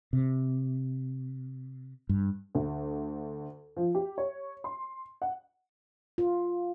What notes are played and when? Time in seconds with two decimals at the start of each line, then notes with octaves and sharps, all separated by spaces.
0.13 C3
2.09 G2
2.55 D2
3.77 F3
3.95 G4
4.18 C#5
4.64 C6
5.22 F#5
6.18 F4